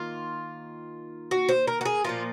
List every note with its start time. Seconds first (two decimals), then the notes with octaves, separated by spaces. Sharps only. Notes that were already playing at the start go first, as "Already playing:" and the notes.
Already playing: D#3 A#3 F4
1.31 F#4
1.49 C5
1.67 A#4
1.81 F#4
1.85 G#4
2.04 A#2 F3 A#3 F4